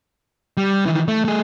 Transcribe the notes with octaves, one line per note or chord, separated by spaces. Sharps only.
G3
D#3 E3
A3
A3 G#4